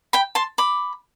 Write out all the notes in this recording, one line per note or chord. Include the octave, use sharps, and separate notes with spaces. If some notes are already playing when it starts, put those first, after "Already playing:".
G5 B5
A5 C6
B5 D6